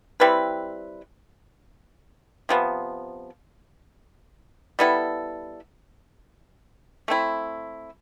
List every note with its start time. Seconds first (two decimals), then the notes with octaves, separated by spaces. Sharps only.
0.20 G3 C4 E4 B4
2.49 C3 F3 B3
4.79 G3 B3 E4 A4
7.08 A3 C4 E4